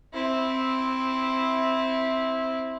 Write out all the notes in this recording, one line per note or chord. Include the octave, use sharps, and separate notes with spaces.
C4 E4